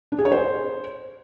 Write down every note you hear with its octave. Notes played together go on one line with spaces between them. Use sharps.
D4
G#4
C#5
C5